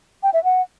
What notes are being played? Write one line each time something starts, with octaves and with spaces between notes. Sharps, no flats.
G5
E5
F#5